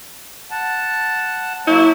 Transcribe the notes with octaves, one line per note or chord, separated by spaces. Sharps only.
F#5 A5
F#3 A#3 E4 C#5